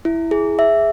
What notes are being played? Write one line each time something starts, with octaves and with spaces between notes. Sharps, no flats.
E4
G#4
E5